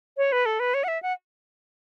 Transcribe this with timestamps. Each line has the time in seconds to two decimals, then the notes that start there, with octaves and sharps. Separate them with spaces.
0.17 C#5
0.32 B4
0.46 A4
0.60 B4
0.74 C#5
0.84 F#5
0.88 E5
1.02 F#5